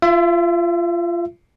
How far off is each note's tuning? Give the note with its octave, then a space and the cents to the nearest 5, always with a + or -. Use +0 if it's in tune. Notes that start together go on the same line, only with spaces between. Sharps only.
F4 -20 E5 +30